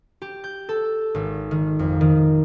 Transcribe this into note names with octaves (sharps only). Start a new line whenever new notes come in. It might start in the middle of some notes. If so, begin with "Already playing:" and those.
G4
G6
A4
G#1
D#3
F2
D#3